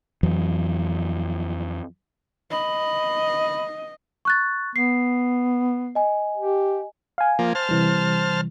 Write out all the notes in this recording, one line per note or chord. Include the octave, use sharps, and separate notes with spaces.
F2 E3 F#3
D#5 B5
C#6 F#6 A6
B3 C7
D#5 G#5
G4
F5 G#5
F3 A#3
C5 A5 F6
C3 E3 G3